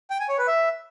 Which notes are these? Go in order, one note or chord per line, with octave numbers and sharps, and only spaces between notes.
G5
G#5
C#5
B4
E5